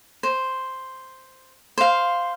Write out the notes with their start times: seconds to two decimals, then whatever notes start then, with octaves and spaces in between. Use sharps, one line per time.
0.23 C5
1.78 C5 F5